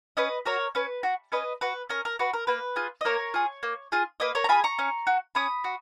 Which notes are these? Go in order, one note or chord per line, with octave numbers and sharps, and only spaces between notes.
C#4 B4 D#5
F#4 A#4 C#5
C#4 B4
F#4
C#4 B4 D#5
F#4 B4
C#4 A#4
A#4
F#4 B4
A#4
A#3 B4
F4 G#4
D#5
A#3 A#4 C#5
F4 G#4
A#3
F4 G#4
A#3 B4 D#5
A#4 C#5
A#5
F4 G#4 G#5 B5
A#5 C#6
C#4
F#4
C#4 B5 D#6
F#4